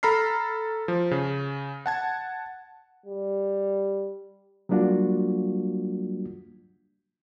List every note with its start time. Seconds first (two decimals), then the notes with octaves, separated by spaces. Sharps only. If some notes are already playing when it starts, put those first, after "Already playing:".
0.03 A4 A#5 B5 F6 C7
0.88 F3
1.11 C#3
1.86 F#5 A5 G#6
3.06 G3
4.69 F#3 G3 A#3 D4 F4 F#4